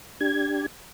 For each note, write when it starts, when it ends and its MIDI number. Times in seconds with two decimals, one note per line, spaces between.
0.20 0.66 62
0.20 0.66 67
0.20 0.66 92